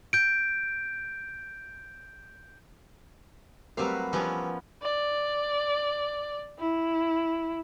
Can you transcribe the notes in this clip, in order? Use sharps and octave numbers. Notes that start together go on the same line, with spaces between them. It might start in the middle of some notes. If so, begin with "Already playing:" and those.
G6 D7
C3 F#3 G3 A3 A#4 B4 F5
E3 F3 G3 B3 C#4
D5
E4